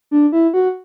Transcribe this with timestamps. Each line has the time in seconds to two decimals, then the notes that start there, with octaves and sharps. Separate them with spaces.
0.11 D4
0.32 E4
0.54 F#4